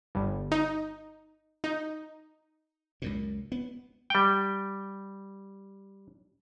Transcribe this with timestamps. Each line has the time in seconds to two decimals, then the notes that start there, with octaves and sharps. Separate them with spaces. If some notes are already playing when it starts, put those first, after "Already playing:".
0.15 G1 G2
0.52 D#4
1.64 D#4
3.02 C#2 F#2 A#2
3.52 B3
4.10 G3 G5